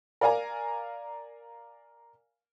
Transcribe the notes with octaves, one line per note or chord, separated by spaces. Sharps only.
A#4 D5 F5 G#5 A#5